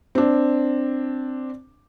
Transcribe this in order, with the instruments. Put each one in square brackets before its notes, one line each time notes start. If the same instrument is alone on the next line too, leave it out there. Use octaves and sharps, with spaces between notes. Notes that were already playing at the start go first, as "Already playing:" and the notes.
[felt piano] C4 D4